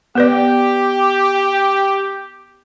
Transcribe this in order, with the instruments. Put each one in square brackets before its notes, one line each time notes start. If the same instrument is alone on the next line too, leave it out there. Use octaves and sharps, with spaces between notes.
[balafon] B3 B4 D5 [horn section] G4